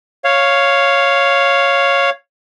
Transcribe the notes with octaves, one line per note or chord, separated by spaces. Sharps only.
C#5 F5